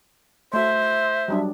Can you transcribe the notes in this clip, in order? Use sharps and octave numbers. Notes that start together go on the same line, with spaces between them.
A3 F#4 C5 E5
F#3 G3 D4